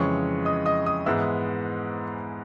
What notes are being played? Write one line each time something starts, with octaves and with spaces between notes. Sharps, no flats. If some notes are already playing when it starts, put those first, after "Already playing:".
Already playing: F2 C#3 E3 G#3 C#5 C#6
D#5 D#6
D#5 D#6
D#5 D#6
G#2 E3 G#3 B3 E5 E6